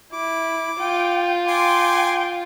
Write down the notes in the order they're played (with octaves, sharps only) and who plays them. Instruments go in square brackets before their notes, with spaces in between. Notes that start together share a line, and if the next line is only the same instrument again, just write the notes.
[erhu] E4 [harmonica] D6
[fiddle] F4 [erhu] G5
[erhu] G5 [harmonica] G#5 C6 D6